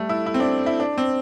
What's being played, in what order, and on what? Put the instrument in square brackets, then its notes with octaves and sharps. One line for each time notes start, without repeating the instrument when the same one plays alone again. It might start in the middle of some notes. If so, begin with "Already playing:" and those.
Already playing: [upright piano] G3 A3
E4
E4
C4
D4
E4
D4
C4